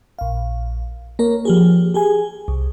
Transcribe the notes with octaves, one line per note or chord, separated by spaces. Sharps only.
A#1 F5
A#3 A#4 C#5
F3 G4 G#4
G4 G#4 G#5
C2